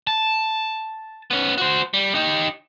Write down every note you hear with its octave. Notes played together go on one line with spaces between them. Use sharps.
A5
B3 C#4
F#4 C5
G3
D#4 G4